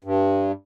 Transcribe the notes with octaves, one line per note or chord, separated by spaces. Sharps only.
G2